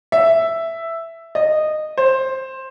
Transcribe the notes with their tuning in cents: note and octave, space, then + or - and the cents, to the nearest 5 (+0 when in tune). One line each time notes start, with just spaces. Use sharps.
E5 +5
D#5 -15
C5 +10